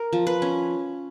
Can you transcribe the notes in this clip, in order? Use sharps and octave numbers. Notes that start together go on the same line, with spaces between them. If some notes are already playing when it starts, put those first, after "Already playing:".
Already playing: A#4
F3
B4
C#4